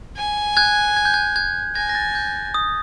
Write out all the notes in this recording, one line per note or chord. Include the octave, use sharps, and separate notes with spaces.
G#5
F#6 G#6
G#6
G6
F#6 G#6
F#6 G#6
G#5 G#6 A#6
A#6
G6 A6
G6
D#6